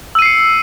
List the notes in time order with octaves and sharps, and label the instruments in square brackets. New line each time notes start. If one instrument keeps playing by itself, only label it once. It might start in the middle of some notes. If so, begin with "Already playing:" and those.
[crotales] E6
D#7
C7
C#7